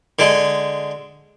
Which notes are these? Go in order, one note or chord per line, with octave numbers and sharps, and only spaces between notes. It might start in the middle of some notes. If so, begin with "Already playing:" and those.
D3 G#3